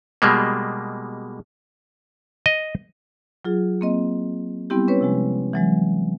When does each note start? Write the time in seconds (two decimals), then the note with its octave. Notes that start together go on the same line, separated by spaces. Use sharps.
0.22 B2 G3 G#3 A#3
2.46 D#5
3.45 F#3 F4 G#4
3.81 A#3 C4 D#5
4.70 G3 B3 C4 E4 G4
4.88 C#4 B4 C#5
5.01 C3 F3 G#3
5.53 E3 F#3 G#3